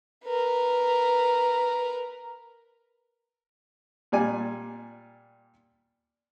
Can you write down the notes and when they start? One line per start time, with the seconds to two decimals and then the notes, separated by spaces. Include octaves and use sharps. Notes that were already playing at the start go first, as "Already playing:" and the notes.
0.25 A#4 B4
4.12 A#2 G3 D5 G#5